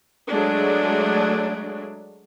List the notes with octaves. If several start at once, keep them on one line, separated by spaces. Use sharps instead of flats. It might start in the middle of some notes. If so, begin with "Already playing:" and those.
F#3 G#3 A3 D4